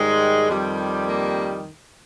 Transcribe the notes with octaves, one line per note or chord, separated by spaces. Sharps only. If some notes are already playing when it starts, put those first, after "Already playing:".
Already playing: G#2 D#3 G3 G#3
F2 D#3 G3
A#3